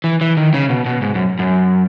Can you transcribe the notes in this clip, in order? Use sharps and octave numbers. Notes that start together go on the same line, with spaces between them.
E3
E3
D#3
C#3
B2
B2
G#2
F#2
F#2